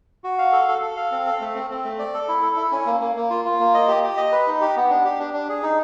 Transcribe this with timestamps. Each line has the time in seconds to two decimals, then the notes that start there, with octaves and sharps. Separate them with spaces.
0.24 F#4
0.38 F5
0.52 A4
0.68 A4
0.82 A4
0.97 F5
1.11 C4
1.26 A4
1.41 A3
1.55 C4
1.70 C4
1.84 A3
1.99 D5
2.14 A4
2.29 E4
2.42 A4
2.57 E4
2.72 C#4
2.86 A#3
3.00 A#3
3.16 A#3
3.30 F4
3.45 F4
3.60 A#3
3.74 D#5
3.88 G4
4.03 G4
4.17 D#5
4.32 B4
4.47 D#4
4.61 G4
4.76 B3
4.90 D4
5.04 G4
5.19 D4
5.34 D4
5.49 G#4
5.63 D#4